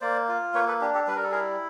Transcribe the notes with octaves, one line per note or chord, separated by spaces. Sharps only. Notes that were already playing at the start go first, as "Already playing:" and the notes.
A#3 C5 D5
F4
A#3 B4 C#5
A4 B4
D4 G4
G4 A4
G3 B4
A#4
A4
E4 G#4 A#4